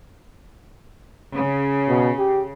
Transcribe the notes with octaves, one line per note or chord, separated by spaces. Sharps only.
C#3
B2
G4